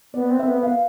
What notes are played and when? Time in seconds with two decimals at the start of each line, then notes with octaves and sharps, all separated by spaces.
0.14 B3 D5
0.30 C4
0.39 E5
0.47 B3
0.63 F5